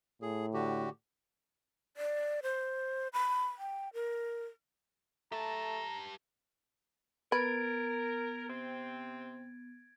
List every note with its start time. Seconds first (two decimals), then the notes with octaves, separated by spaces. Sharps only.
0.22 A2 G#4
0.54 D3 F#4 G4
1.97 D5
2.43 C5
3.13 B5
3.58 G5
3.94 A#4
5.32 A3 G4 A5 A#5
7.32 B3 A#4 B4 G#6 A6 D7
8.49 C3 C4